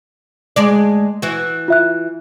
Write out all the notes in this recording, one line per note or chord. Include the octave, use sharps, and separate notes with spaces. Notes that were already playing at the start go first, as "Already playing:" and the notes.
D2 G#3 D5
E3 F#4
F4 E5 F#6